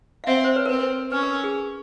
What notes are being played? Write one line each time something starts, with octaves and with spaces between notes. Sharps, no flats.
F5
C4 E5 F#5
C5
B4 C#5
A#4
C4 B4
C#4 B4
A#4
G#4